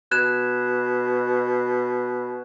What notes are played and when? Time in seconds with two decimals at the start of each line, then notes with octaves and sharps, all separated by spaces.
0.11 B2 F#6 G#6 E7